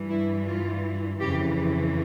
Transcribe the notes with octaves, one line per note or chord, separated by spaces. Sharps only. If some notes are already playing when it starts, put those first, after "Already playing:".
Already playing: G2 E3
E4
F4
F2 C#3 E3 G4